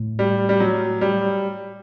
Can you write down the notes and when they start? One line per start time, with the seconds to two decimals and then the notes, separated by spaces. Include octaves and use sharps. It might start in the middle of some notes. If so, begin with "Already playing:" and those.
Already playing: A2
0.19 G3
0.49 G3
0.60 F#3
1.01 G3